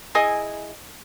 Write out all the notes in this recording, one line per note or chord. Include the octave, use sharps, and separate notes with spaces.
E4 G#4 D#5 G#5